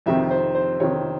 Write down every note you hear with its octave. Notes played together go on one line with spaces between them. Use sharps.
F2 C3 D#3 E5
C5
C5
F2 C3 D#3 C#5